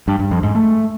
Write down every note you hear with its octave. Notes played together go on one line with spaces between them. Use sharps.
G2
G2
F2
G#2
A3